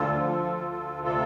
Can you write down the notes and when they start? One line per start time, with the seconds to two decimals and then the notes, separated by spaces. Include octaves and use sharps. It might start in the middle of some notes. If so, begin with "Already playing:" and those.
Already playing: D2 D3 F4 A4
0.14 F3
0.44 D2
0.74 D2
1.03 C3 F4 A4